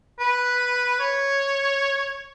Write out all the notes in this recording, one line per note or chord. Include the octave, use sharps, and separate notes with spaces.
B4
C#5